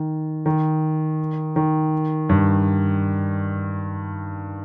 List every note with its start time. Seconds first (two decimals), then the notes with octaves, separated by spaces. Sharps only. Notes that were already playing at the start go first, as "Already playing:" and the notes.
Already playing: D#3
0.46 D#3
1.56 D#3
2.29 G2